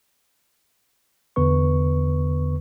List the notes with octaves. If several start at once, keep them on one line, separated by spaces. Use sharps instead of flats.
E2 D3 B3 B4 C#6